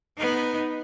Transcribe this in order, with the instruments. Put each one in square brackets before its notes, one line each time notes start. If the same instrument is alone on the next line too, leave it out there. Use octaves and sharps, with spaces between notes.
[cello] B3 D#4